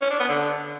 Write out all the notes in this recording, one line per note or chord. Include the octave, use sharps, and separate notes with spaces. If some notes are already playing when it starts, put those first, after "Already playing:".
C#4
D4
B3
D3